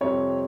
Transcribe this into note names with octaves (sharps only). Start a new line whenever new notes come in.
F2 C3 G3 C4 C#5